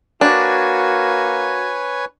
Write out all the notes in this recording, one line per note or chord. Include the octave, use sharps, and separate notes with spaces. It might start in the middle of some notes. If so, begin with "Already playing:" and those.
A#3 D4 F#4 B4 C#5 G#5